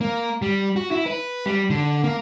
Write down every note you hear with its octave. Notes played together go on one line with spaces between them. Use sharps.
A#3
G3
F#4
E4
B4
G3
D3
A#3